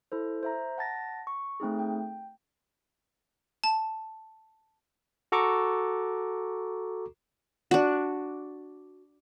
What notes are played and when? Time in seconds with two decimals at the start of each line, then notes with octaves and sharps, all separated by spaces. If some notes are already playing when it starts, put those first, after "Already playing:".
0.12 E4 A4 C5
0.43 C5 E5 A#5
0.78 F#5 A5 A6 A#6
1.27 C#6
1.60 A3 C4 D#4 G#4
1.79 G5
3.64 A5
5.32 F#4 A4 A#5 C#6 D6
7.71 D4 F#4